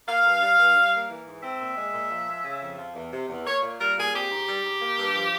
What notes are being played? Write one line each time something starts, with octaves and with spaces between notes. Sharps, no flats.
A#3 F5
G2
G3
G2
G3
A#3
E3
G#2
C4 E5
A#2
G#3
A#2
F3
G#3
C#3
F2
F3
E2
C3
E2
A#3 C#5
A#2
G3 A#4
A#2 G#4
C4 G4
G#2
G3
G#2
A#3
G2
F3